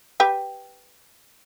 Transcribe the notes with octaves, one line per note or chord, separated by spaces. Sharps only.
G4 B4 G5